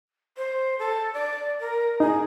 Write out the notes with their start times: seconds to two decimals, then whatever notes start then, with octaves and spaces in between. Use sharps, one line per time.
0.37 C5
0.79 A4
1.13 D5
1.60 A#4
2.00 D#4 G#4